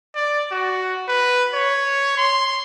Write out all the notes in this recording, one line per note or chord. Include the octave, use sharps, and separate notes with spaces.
D5
F#4
B4
C#5
C6